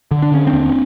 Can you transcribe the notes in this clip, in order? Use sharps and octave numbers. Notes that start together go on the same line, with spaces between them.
D3
D4
D3 C#4
C4 D4
D#2